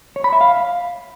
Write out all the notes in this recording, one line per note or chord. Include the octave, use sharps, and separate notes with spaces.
C#5
B5
E5
F5